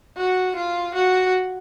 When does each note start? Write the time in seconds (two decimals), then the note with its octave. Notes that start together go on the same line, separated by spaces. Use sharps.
0.17 F#4
0.55 F4
0.94 F#4